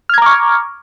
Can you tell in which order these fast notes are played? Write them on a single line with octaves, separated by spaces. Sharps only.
F6 G#6 A#5 D6 C#6